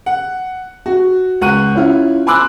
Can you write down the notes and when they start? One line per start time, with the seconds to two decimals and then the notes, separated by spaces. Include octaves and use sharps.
0.06 F#5
0.86 F#4
1.41 C#2 F#5 C#6 F#6 D#7
1.75 C#4 E4 F4
2.27 G#5 B5 C6 D6 E6 F#6